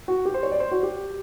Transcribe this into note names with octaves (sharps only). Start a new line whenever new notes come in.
F#4
G4
C5
C#5
D5
C5
F#4
G4